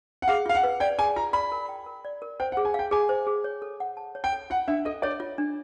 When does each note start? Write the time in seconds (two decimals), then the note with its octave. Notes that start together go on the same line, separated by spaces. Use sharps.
0.22 F#5
0.28 G#4 F5
0.46 F4 F5
0.55 F#5
0.63 B4
0.80 D5 G5
0.98 G#4 G#5
1.16 F4 A#5
1.33 D5 B5
1.52 A#4
1.69 G5
1.86 A#4
2.05 D5
2.22 A#4
2.40 C5 G5
2.52 F#5
2.57 G#4
2.65 G#5
2.74 F5 G5
2.91 G#4 G#5
3.09 C5
3.27 G#4
3.44 C#5
3.62 A4
3.80 F#5
3.97 A5
4.15 C#5
4.24 G5
4.33 A4
4.50 F4 F#5
4.68 D4 E5
4.85 A4 D#5
5.02 C#5 D5
5.20 F4
5.38 D4